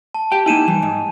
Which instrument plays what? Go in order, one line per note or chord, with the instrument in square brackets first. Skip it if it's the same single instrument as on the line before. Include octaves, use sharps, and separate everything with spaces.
[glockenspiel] A5
[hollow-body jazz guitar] G4 G5
[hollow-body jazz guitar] A#3 D#4 E4 [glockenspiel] G#5 D#7 E7
[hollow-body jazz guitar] E3 G3
G#2